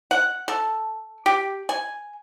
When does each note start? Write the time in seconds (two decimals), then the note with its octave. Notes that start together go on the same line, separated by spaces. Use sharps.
0.11 F#5
0.48 A4
1.26 G4
1.69 G#5